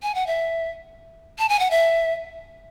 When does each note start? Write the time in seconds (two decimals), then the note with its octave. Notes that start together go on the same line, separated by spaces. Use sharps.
0.03 G#5
0.15 F#5
0.27 E5
1.39 A5
1.49 G#5
1.60 F#5
1.70 E5